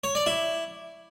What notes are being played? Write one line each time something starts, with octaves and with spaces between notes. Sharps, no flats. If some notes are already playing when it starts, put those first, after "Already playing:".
C#5
D5
E4